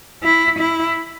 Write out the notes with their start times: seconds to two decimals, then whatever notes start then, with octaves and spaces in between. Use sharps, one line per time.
0.23 E4
0.59 E4